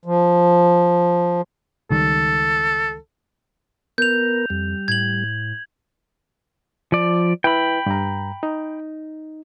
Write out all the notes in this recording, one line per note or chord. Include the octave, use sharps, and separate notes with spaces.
F3
C#2 D#3 G3 A4
B3 A#4 G6 F7
F2 G3
A2 G#6 F#7
F3 D5
E4 B4 G5 B5
G2 A#5
D#4